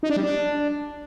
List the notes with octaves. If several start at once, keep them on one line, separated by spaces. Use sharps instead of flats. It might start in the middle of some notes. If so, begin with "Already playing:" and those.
D#4
D4
G3
D4